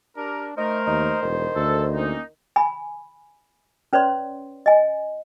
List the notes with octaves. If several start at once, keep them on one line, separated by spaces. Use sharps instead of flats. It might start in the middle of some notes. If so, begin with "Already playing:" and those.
D4 G4 A#4
A3 D#4 A#4 C5
D#2 D#4
E1 D#3
D2 A4
A#3 C#4 D#4
G#5 B5
C#4 B4 C#5 D5 C6
D#5 G#5